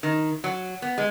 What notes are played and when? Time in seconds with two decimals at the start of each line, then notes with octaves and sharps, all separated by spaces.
0.03 D#3
0.44 F#3
0.82 B3
0.98 G#3